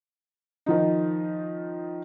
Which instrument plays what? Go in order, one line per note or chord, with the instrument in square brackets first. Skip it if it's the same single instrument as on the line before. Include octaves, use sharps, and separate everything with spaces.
[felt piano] D#3 F3 D#4